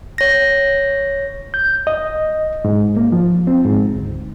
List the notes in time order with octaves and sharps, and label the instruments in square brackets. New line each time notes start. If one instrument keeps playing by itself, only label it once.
[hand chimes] C#5 A#6
[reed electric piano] G6
D#5
G#2
A#3
F3
C4
G#2
D2